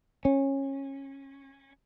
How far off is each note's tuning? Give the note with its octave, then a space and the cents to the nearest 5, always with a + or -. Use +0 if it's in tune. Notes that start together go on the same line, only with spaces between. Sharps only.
C#4 -20